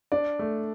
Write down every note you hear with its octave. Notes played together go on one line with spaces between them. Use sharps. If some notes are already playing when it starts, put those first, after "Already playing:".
D4 D5
A3